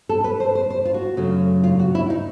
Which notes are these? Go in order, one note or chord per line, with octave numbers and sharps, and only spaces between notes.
A4
B4
C5
C5
C5
F4
F#4
F#2 C#3 F#3 A3
F4
F#4
E4
D#4